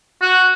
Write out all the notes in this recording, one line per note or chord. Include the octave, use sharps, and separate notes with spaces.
F#4